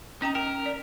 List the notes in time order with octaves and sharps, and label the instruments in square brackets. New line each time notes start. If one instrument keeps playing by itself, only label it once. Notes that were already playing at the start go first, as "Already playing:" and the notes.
[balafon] C#4 G5 A#5 [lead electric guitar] D#4
[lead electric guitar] A#4 [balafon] G5
[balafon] D5